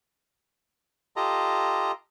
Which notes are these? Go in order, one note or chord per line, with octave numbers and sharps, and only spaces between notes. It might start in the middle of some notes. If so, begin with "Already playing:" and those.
F4 G4 A4 D#5 A#5